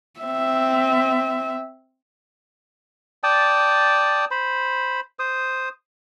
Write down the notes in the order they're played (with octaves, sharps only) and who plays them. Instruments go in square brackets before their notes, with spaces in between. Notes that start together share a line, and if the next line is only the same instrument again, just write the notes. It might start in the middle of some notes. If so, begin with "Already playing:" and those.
[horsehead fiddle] C4 E5
[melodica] D5 G5 A5 D#6
C5 B5
C5 D#6